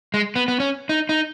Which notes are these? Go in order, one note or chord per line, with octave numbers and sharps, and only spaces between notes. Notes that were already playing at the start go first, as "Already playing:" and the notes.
G#3
B3
B3
C#4
D#4
D#4